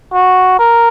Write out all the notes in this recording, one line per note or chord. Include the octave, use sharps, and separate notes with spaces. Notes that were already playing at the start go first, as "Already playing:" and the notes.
F#4
A#4